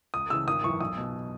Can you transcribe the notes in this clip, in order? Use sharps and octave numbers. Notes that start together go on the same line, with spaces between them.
C#2 D#6
C#3 E3 E6
G#1 D#6
F#2 E3 C#6
B1 D#6
B2